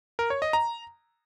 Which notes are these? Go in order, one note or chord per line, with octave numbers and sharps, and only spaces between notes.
A#4
C#5
D#5
A#5